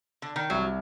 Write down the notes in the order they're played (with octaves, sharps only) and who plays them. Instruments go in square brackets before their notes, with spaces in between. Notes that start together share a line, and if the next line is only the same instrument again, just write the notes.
[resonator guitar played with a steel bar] D3
D#3
[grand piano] C2 [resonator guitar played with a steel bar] F#3